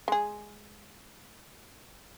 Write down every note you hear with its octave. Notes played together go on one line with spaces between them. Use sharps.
G#3 G#4